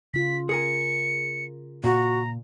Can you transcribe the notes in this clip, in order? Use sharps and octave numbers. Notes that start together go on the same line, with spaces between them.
C#3 F4 B6
G#4 A#4 G#5 C#7
A#2 F#4 A#5